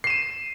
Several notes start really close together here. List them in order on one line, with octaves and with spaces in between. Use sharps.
C7 E7 D#7